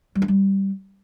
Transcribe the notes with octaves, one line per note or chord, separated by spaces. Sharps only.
G3
D4
G3